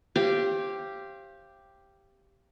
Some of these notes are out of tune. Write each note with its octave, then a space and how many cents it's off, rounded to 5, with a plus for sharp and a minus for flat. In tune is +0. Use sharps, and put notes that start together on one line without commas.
G4 +0 C5 +35 F5 -30